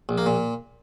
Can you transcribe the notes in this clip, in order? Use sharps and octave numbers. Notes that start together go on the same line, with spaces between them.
A#1
A#3
A#2